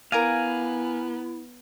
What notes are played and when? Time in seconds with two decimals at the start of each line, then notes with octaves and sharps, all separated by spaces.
0.12 B3 E4 A#4 F5 G#5 A#5 D6